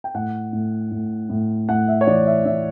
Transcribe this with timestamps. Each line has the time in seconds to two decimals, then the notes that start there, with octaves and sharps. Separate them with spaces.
0.04 G5
0.14 A2 F#5
0.53 A2
0.91 A2
1.29 A2
1.69 A2 F#5
1.88 E5
2.01 C#5
2.07 E3 D5
2.26 E5
2.45 E3 E5